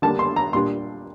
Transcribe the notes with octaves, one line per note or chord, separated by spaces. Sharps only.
D3 G3 A#3 D4 A5
C6
A#5
A#2 G3 D4 C6